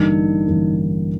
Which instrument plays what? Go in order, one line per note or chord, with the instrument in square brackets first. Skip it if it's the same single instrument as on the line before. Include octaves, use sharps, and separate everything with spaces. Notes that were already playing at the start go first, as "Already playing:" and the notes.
Already playing: [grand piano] A1 G2 D3 G3 A#3 [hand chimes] D#4
[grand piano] A1 G2 D3 G3 A#3